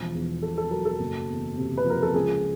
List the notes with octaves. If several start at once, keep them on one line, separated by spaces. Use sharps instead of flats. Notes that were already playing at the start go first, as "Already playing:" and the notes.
Already playing: E1 F3
E2
B2 A4
A4
F#3 A#4
A4
F#1
E2
C3
B4
F3 A#4
A4
C#2 G#4